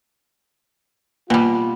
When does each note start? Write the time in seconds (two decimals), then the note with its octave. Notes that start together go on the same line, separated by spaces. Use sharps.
1.30 B2 G3 A#3 F4